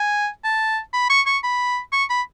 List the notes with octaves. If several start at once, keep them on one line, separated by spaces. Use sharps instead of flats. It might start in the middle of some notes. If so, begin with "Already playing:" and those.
Already playing: G#5
A5
B5
C#6
C#6
B5
C#6
B5